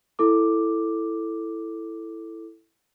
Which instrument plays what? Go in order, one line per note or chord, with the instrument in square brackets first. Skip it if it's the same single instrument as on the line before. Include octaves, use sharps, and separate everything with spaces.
[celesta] E4 A4 D6